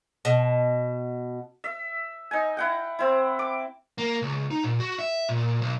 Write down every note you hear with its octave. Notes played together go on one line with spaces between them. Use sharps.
B2
E5
D#4 G#5
E4 F#5 G5
C4 E4
D6
A#3
C#2
D#4
A#2
F#4
E5
A#2
B1